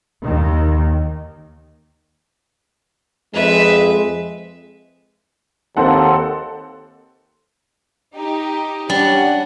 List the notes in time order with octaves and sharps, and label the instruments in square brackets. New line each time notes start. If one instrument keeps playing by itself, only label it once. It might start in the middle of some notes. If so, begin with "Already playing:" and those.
[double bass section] D#2 D#3
[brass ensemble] F2 G#3 [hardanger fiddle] B4 E5
[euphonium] D#2 [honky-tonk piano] C4 A4 F#5
[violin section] D#4 G4
[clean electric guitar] G3 [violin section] C#4 F#5 [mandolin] D4